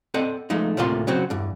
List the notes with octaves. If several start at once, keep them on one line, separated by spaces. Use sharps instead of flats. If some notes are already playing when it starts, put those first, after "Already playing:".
C4 A4 D5 D#5 F#5
F3 G#3 A3 D#4
D2 A2 C3 A#3 F4 C6
C#3 F#3 C4 F#4
E2 G2